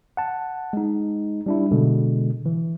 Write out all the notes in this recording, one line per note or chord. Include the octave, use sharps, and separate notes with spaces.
F#5 A5
G#3 D#4
G3 D4 E4
B2 D3 G#3
E3